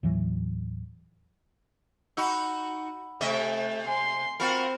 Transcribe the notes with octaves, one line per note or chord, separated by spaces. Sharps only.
D#2 A2 E3 F#3
D#4 F#4 F#5 B5 E6
C3 A3 D#5 E5
G#5 C6
C4 F4 F#4 A#4 B5